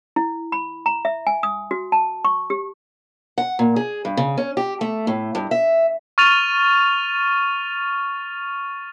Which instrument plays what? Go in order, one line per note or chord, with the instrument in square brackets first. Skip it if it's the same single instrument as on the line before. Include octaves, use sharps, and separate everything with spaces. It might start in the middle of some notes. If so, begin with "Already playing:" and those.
[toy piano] E4
B5
A#5
E5
G#5
D#6
F#4
A5
C#6
G4
[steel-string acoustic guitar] F#5
A#2
G#4
G2
C#3
C#4
G4
A3
A2
G2
E5
[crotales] C#6 F6 A6 D#7 F7